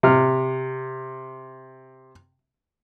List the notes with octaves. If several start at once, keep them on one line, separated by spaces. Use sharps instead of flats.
C3 F6